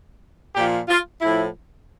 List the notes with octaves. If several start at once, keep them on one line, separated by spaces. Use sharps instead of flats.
A#2 F3 G4
F4
A2 F3 E4